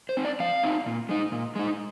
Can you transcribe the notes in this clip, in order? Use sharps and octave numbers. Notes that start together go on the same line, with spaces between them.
C5
C4 D#4
D5
F3 F5
C4 D#4
A#2
G#3 D#4
A#2
G#3 D#4